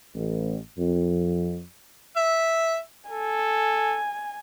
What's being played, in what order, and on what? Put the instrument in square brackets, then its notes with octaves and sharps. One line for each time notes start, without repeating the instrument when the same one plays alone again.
[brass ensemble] A1
F2
[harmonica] E5
[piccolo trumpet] A4 [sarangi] G#5